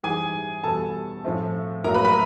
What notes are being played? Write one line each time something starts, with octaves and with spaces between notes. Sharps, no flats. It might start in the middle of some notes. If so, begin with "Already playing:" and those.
G#2 E3 G3 G#4 G#5
E2 B2 G3 B3 A4 A5
A2 F3 A3 C4
A2 F#3 A#3 A#4 A#5
B4 B5
B4 B5